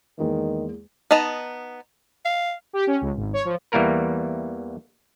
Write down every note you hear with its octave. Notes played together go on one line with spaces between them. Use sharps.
E2 D#3 G#3 A#3
B3 D#4 D#5 A5 A#5
F5
G4
C#4
C#2
G#1
C#5
F3
E2 E3 G3 A#3 A#4 B4